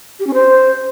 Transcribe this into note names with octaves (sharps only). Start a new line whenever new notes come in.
G4
C#4
C5